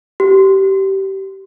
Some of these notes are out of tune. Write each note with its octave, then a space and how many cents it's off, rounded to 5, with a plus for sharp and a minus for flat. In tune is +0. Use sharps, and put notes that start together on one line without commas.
G4 -20